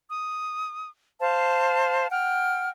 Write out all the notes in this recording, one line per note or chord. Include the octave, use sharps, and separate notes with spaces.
D#6
C5 F5 A5
F#5 G5 F6